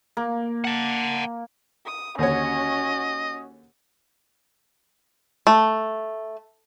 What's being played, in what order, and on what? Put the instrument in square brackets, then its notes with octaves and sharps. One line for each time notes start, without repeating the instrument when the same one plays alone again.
[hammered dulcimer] A#3
[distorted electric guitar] F#5 A5
[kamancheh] D#6
[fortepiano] D#2 D3 C#5 [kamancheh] C#4 F#4 [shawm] D#5
[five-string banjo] A3